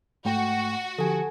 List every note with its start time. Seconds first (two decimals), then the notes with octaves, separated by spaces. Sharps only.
0.25 G#2 A3 F#4 G5
0.98 D3 F3 G4 A4 G#5